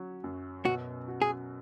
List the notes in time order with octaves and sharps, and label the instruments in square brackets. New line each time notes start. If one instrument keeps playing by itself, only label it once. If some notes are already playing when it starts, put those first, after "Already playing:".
Already playing: [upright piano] F#3 C#4
F#2
[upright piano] B2 [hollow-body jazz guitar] F#4
[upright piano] F#4
[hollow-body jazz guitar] G#4